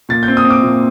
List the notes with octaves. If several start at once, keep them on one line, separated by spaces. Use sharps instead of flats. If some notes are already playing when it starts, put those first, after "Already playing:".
A#2 A6
G6
C4
D#6
C4
D6
A#2